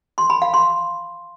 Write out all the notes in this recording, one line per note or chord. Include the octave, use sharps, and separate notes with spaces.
C6
B5
F5
C6